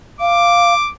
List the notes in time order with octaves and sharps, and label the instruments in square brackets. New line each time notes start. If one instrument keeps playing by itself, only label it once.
[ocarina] F5 [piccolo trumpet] D6